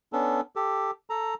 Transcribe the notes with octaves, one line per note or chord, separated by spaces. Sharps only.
B3 C#4 D4 A4
G4 A4
A4 A#5